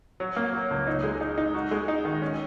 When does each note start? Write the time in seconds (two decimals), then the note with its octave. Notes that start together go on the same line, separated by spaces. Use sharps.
0.20 F#3
0.36 A#3
0.53 F#3
0.70 C#2
0.87 D#4
1.04 G#3
1.21 D#4
1.38 D#4
1.54 F#4
1.71 G#3
1.88 D#4
2.05 D#3
2.22 C#4